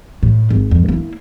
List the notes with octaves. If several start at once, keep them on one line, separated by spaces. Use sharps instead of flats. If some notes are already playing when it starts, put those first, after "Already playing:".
A2
G#1
F2
A#3 E4